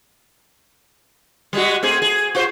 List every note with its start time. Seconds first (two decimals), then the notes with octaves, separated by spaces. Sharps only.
1.53 G3 G#3 F#4
1.83 A3 C4 G#4
2.02 G#4
2.35 F4 F#4 C5